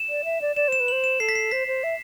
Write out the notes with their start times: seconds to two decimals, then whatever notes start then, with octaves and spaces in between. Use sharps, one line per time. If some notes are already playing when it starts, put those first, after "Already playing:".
Already playing: E7
0.09 D5
0.25 E5
0.41 D5
0.56 D5 E7
0.68 C5 E7
0.80 B4
0.88 C5 F#7
1.04 E7
1.20 A4 C7
1.29 B6
1.35 C7
1.51 C5 B6
1.67 C5
1.84 E5